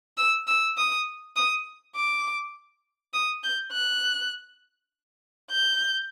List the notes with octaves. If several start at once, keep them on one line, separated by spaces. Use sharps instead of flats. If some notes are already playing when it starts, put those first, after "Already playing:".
E6
E6
D#6
D#6
D6
D#6
G6
F#6
G6